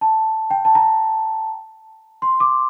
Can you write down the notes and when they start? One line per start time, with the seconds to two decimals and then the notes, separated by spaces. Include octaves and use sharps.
0.01 A5
0.51 G5
0.65 A5
0.75 A#5
2.22 C6
2.40 D6